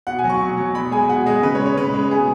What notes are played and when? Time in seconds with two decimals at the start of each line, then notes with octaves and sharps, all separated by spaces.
0.07 B2 F#5
0.19 G#5
0.24 F#3
0.30 C#6
0.40 B2
0.57 F#3
0.75 B2 B5
0.91 G#3 G#5
1.09 B2 F#5
1.26 G#3 D#5
1.43 C#3 B4
1.55 C#5
1.60 G#3
1.66 C#5
1.77 C#3 B4
1.94 G#3
2.11 B2 G#4